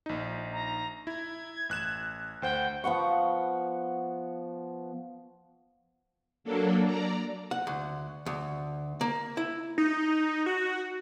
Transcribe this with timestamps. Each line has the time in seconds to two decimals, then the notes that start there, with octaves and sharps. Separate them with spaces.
0.06 A#1 D#4
0.53 A#5
1.07 E4 G#6
1.69 A1 F#6 E7
2.42 D2 C5 F#5 G5
2.84 F3 B3 F#5 C#6
6.44 F#3 A#3 D4 A4
6.85 D5 A#5
7.51 F#5
7.67 D2
8.26 D2
9.01 A#3
9.37 E4
9.78 D#4
10.46 F#4